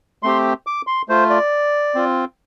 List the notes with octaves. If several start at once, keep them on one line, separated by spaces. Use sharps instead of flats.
A3 C4 G4 C6
D6
C6
A3 F4 C5
D5
C4 F4